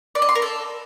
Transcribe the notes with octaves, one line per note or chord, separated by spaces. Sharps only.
D5
D#5
C6
A#4
A4